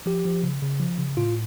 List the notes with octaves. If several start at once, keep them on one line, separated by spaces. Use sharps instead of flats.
F3 G4
F3
C#3
C#3
F3
C#3
A2 F4